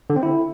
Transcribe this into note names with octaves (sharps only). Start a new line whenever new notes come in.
D3
C4
E4